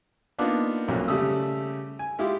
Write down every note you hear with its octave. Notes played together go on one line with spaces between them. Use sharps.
A#3 B3 D4 D#4 F4
B1 F2 F#3 A#3 C#4
C#3 G3 A3 D#6 E6
G#5
G#3 E4 F4 G4